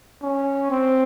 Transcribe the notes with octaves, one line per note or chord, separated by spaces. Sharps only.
C#4
C4